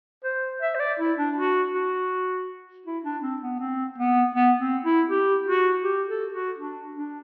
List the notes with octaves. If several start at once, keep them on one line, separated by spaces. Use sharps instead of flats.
C5
E5
C5
D5
E4
D4
F#4
F#4
E4
D4
C4
B3
C4
B3
B3
C4
E4
G4
F#4
G4
A4
F#4
D4
D4